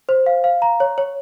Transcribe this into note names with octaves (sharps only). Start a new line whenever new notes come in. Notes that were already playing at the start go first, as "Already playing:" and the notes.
C5
F5
F5
A#5
C#5
C#5